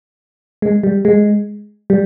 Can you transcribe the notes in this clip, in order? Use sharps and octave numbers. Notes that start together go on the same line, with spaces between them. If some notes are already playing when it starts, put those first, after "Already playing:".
G#3
G3
G#3
G3